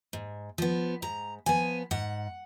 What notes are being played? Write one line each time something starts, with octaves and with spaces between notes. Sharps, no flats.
G#2
F3 B3
G#2 A#5
F3 B3 G#5
G#2 F#5